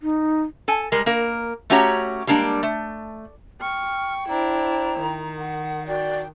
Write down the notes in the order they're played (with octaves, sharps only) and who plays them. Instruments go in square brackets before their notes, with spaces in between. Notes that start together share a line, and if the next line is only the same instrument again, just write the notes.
[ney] D#4
[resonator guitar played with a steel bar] A4 G#5
G3 G#3 A#4
A#3 A#4
A3 C#4 F#4 G4 C#5 A#5
G3 G#3 A#3 D4
A3
[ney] G5 [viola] C#6 [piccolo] F6
[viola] D4 E4 [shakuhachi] C5 [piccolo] A#5
[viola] D#3
[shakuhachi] F#5
[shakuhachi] F#4 [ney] D5 [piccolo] G5